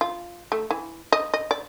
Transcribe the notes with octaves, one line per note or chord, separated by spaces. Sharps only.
F4
A3
E3
D#5
D#5
D5